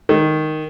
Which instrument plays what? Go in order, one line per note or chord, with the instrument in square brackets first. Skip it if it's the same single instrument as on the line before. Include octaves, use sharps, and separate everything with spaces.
[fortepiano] D#3